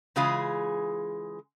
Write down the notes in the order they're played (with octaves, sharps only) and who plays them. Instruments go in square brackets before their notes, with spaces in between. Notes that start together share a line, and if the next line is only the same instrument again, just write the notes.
[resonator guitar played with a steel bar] C#3 E3 G#3 F4 G#4